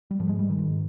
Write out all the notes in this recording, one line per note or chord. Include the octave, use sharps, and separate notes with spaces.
G3
G#2 F3
G#3
G3
D#3
G#2